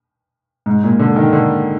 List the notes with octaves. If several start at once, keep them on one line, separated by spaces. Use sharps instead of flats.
G#2
A#2
D3
D#3
D3